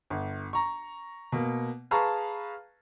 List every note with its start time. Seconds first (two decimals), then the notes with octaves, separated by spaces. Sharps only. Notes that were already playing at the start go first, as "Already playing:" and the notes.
0.10 G1
0.53 A#5 C#6
1.32 B2 A#3
1.91 G#4 B4 F5 A5 A#5 C#6